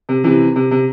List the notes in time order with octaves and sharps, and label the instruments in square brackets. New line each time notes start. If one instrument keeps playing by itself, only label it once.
[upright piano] C3
C3 E3
C3
C3